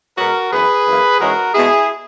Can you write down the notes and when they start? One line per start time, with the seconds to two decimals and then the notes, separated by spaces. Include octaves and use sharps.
0.17 B2 G#3 B3 F#4 A#4
0.52 F#2 E3 B3 G#4 B4
0.86 F#2 E3 A#3
1.20 G#2 E3 G#3 C#4 F#4 A#4
1.53 B2 G#3 B3 E4 G#4